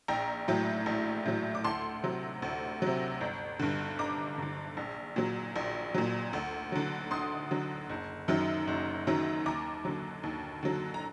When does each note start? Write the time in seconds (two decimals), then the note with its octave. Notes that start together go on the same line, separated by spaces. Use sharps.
0.08 A#1 G5 A#5
0.48 A2 F#3
0.86 A#1
1.25 A2 F#3
1.55 D6
1.64 D2 A5 C6
2.03 C3 F#3
2.42 D2
2.82 C3 F#3
3.21 G1
3.59 G2 D3
3.99 G1 A#5 D6
4.38 G2 D3
4.77 A#1
5.16 A#2 F#3
5.56 A#1
5.94 A#2 F#3
6.33 D2
6.72 D3 F#3
7.11 D2 C6 D#6
7.51 D3 F#3
7.90 F#1
8.28 F#2 D#3 F#3
8.68 F#1
9.07 F#2 D#3 F#3
9.46 D#2 A#5 D6
9.85 D3 F#3
10.23 D#2
10.63 D3 F#3
10.94 A#5